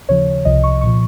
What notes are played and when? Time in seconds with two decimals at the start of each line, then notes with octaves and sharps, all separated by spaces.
0.09 D#2 C#3 F3 C#5
0.45 C2 C3 F3 D#5
0.64 C#6
0.81 A#2 F3 C#6